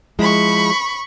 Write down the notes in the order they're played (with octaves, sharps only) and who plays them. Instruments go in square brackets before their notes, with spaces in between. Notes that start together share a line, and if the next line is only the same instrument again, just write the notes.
[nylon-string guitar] F3 G#3 E4 [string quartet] B5 C#6